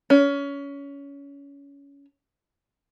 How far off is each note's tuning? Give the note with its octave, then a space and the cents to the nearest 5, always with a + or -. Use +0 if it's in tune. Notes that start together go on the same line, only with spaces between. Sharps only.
C#4 +25